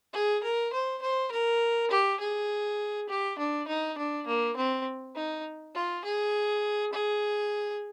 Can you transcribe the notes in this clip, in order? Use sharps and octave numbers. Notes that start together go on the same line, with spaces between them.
G#4
A#4
C5
C5
A#4
G4
G#4
G4
D4
D#4
D4
A#3
C4
D#4
F4
G#4
G#4